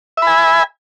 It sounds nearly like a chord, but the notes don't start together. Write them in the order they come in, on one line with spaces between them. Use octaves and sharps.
E5 B5 G#5